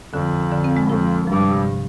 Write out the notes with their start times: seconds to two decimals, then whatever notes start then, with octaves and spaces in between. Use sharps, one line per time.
0.13 F2 D3
0.51 D3
0.64 C4
0.77 G#3
0.89 F2 F3
1.27 G2 F3
1.39 C3
1.51 C3